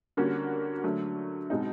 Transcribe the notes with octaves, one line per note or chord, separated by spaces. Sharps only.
D3 G3 A#3 C#4 F#4
D3 F#3 A3
B2 G#3 C4 D#4